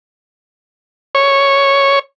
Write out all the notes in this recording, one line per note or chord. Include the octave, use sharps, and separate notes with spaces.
C#5